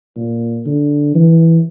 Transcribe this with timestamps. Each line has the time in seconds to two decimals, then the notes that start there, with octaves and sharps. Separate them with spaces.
0.16 A#2
0.66 D3
1.15 E3